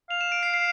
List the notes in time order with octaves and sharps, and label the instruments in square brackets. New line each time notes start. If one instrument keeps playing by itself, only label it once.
[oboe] F5 [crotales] F7
[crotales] E7
D7
C7
C7